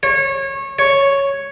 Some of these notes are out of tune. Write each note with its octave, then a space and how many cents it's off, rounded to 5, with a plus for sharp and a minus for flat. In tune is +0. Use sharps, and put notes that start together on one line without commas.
C#5 -25
C#5 +0